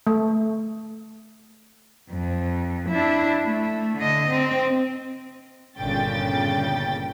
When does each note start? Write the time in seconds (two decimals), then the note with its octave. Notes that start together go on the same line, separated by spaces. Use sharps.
0.07 A3
2.11 F2
2.90 D4 E4
3.44 A3
3.98 D3 D#5
4.29 C4
5.78 G1 A#2 C#3 G5 A6